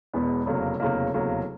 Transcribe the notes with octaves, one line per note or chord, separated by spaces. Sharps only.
E1 E2 B2 G#3 B3
F1 E2 C#3 F#3 A#3
F1 E2 C#3 F#3 A#3
F1 E2 C#3 F#3 A#3